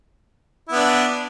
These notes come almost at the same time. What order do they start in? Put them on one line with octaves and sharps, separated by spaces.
E4 B3 D4